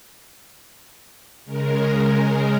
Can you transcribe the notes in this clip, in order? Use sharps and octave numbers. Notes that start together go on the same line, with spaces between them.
C#3 G#3 A#4